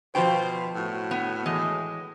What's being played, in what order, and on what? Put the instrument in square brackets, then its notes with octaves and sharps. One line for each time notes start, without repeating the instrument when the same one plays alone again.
[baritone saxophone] B2 [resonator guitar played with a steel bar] F3 F4 G5 [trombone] C5
[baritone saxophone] A2 [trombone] F#4
[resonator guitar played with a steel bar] B3
E3 G#3 D#5